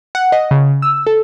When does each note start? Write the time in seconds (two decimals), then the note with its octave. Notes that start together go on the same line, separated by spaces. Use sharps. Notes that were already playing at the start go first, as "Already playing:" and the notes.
0.15 F#5
0.32 D#5
0.51 C#3
0.82 E6
1.07 A4